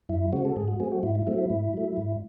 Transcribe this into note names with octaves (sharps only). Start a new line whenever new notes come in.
F#2 E4
C#3 G#3 C4 F#4
A4
G#2 G#4
F#4
F#3 A3 C4 G#4
F#4
G#2 E4
E4
F#3 A3 C4 E4
E4
G#2
F#3 A3
G#2